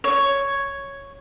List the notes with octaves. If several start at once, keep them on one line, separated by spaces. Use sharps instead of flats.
C#5